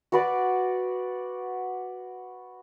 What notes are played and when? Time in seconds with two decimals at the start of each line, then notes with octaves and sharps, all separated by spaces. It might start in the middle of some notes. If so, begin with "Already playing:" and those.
0.12 F#4 B4 D5